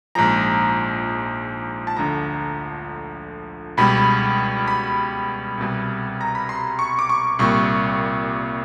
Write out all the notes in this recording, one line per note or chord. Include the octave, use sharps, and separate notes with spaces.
A#1 G#2 F3 A#5
A5
D2 D3 F3 A#5
C#2 B2 G3 B5
B5
C2 B2 G3
A#5
B5
C6
C#6
D6
C#6
C2 A#2 G3 C#6